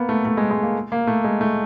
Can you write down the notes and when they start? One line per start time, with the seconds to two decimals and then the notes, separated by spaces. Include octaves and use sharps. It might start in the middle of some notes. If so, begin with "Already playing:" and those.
Already playing: A#3 B3
0.09 A3
0.25 A3
0.37 G#3
0.51 G#3
0.63 A#3
0.92 A#3
1.07 A3
1.24 G#3
1.41 A3